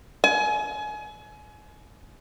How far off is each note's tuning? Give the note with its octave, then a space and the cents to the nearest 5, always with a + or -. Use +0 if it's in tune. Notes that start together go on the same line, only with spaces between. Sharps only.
G#5 +30